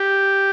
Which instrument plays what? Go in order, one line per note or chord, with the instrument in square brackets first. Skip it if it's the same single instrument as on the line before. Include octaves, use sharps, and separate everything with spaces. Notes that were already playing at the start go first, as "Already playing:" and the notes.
Already playing: [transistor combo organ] G4